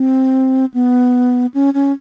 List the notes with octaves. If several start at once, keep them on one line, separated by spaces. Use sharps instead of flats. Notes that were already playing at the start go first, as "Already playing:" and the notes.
Already playing: C4
B3
C#4
C#4